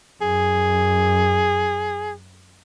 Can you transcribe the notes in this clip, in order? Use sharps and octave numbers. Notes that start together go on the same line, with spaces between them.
F#2 G#4